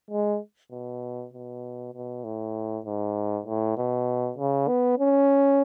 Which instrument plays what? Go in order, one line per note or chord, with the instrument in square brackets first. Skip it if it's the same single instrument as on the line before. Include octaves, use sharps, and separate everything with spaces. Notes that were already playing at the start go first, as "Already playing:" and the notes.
[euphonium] G#3
B2
B2
B2
A2
G#2
A2
B2
C#3
B3
C#4